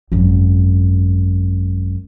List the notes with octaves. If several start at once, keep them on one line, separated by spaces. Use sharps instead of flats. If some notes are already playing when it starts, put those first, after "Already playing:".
G#1 F#2